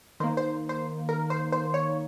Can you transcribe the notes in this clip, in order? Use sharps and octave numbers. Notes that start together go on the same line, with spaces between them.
D#3 A#3 C5
C5
C5
A#4
C5
C5
C#5